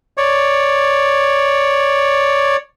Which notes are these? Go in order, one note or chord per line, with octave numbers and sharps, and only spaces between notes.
C#5 D5